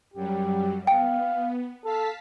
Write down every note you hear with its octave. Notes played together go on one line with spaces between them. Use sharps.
F#2 F#3 G3 G4
B3 F5 G5
A4 F5 A5 B6